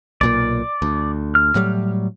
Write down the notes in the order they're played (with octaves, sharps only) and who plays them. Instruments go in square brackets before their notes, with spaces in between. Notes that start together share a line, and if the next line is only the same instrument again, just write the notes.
[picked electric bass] B1 A#2 A#3 [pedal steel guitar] D5
[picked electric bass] D2
[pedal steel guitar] F6
[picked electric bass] A2 F#3 G3